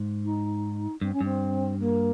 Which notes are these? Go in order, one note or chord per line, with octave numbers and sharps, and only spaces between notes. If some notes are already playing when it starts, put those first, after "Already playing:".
Already playing: G#2
D#4
G2 C4
C#4
G2 C4
A#3